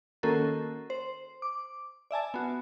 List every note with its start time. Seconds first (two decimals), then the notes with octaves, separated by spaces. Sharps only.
0.23 D#3 A#3 C#4 F#4 A4 A#4
0.90 C5
1.42 D6
2.11 D5 E5 G#5 A5
2.34 B3 F#4